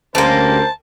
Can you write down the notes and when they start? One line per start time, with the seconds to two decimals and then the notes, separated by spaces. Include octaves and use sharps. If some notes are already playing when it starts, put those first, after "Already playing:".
0.15 D2 G3 A#3 C#4 A#4 C5 A5